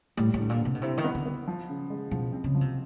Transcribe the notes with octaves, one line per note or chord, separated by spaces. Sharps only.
A2 G3
A2
D3
A#2
D3
C3
B2
C3 E4
D#3
B3
D3
B3
F3
C#3
G#3
B2 F3
C4
C#3
F3
C3